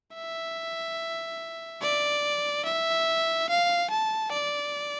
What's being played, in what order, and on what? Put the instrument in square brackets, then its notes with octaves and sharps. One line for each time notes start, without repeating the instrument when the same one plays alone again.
[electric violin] E5
D5
E5
F5
A5
D5